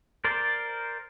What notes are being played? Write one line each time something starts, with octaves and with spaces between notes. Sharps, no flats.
A#4 C5 D5